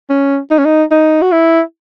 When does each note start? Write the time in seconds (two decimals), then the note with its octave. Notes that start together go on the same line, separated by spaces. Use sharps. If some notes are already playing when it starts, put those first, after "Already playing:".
0.10 C#4
0.51 D#4
0.58 C#4
0.65 D#4
0.91 D#4
1.22 F#4
1.32 E4